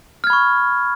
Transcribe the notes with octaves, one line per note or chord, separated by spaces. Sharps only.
B5 C#6 F6 G#6